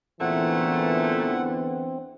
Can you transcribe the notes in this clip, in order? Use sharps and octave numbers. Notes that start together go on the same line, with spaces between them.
E2 A#2 D3 E3 A3 C4 F#5